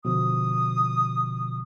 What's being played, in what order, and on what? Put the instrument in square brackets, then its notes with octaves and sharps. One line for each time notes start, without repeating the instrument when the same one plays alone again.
[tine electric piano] B2 D3 F3 [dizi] D#6